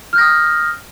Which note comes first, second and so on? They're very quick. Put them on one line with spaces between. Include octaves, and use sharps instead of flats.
F6 G6 A#6 D#6